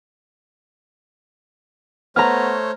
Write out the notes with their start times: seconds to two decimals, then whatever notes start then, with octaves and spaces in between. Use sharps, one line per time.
2.16 A3 B3 C5 C#5 A#5 F6